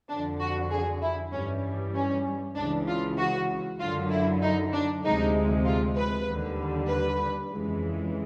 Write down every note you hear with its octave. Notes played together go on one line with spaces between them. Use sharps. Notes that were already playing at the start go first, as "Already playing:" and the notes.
F2 D3 F3 D4
F#4
G#4
E4
G2 E3 G3 C#4
C#4
C#2 C#3 E3 D4
F4
F#4
F#2 D3 F#3 F4
E4
D#4
D4
D2 C3 F3 G#3 D#4
F4
B4
D#2 D3 G3
B4
F2 C#3 E3 G#3